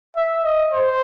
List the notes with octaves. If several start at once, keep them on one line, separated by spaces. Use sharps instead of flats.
E5
D#5
C5